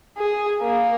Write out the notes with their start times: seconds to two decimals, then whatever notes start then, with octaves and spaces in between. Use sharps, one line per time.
0.18 G#4
0.62 A#3